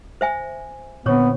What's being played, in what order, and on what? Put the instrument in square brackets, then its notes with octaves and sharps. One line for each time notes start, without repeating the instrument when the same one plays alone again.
[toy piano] C5 E5 G#5
[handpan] A#2 D3 C4 [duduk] B3 [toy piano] C5 C#5 C#6